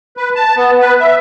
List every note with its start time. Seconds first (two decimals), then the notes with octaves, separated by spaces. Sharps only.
0.17 B4
0.35 A5
0.56 B3
0.80 B4
1.00 E5